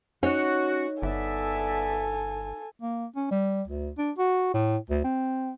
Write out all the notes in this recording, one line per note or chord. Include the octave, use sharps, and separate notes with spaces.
C#4 D#4 F#4 C#5
G1 B3 A4 D5 E5 G#5
A#3
C#4
G3
D2
D4
F#4
A2
D2
C4